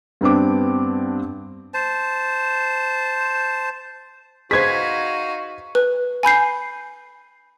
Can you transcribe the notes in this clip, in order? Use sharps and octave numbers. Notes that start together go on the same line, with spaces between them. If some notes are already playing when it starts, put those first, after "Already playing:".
G2 B3 C4 D4 D6
C5 A5
D#4 F#4 G#4 B4 C5 F5 G#6 B6
B4
G#5 B5 G6 C7